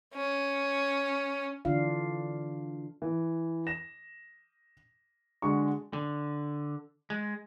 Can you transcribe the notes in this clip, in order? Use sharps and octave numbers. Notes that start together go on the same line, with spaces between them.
C#4
D3 E3 D4 F4 F5
E3
A#6 E7
D3 G#3 F#4 C#6
D3
G#3